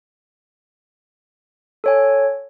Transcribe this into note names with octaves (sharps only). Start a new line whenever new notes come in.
A4 C#5 G#5